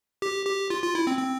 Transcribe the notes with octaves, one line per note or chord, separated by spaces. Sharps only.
G4
G4
F4
F4
E4
C4
C4